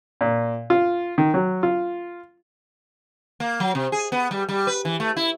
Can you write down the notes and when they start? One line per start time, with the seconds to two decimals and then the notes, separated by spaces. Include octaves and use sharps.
0.21 A#2
0.70 F4
1.18 D#3
1.34 F#3
1.63 F4
3.40 A#3
3.60 F#3
3.75 C3
3.92 G#4
4.12 B3
4.31 G3
4.49 G3
4.67 B4
4.85 E3
5.00 A3
5.17 E4